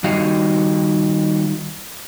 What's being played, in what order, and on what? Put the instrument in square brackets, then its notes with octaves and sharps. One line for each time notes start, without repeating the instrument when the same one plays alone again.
[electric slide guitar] D#3 G3 D#4 F#4 D#5 F5